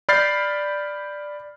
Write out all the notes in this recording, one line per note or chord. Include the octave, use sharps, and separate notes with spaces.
D5 B5 F6 G6 A6 C7